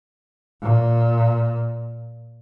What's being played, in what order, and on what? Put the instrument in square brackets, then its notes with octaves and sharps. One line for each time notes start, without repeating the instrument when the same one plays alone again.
[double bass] A#2